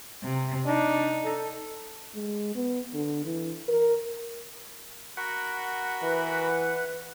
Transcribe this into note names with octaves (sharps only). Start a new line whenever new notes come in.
C3
D4 D#4
A4
G#3
B3
D3
E3
A#4
F#4 A#4 F#5 B5
E3 B4